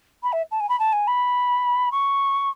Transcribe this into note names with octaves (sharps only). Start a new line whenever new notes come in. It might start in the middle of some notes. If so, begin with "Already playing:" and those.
B5
E5
A5
G#5
B5
A5
G#5
B5
C#6